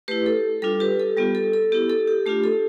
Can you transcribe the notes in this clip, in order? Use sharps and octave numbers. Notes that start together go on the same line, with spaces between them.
A3 E4 G4 B4
A4
G3 D4 F4 A4
G4 B4
A4
G3 B3 F4 G4
A4
A4
B3 E4 G4
A4
G4
A3 D4 F4 G4
A4